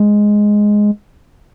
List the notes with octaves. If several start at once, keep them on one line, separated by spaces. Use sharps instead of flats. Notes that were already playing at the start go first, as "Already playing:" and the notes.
Already playing: G#3